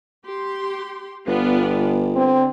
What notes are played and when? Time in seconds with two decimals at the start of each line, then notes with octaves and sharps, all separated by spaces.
0.25 G4 C6
1.27 G1 B3 F4 D5
2.16 D3 C4